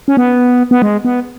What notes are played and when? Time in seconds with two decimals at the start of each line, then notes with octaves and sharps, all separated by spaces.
0.08 C#4
0.17 B3
0.71 B3
0.82 G#3
1.05 B3